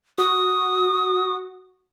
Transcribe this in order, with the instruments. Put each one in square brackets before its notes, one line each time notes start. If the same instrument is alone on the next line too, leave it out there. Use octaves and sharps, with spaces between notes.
[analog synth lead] F#4 [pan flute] D#6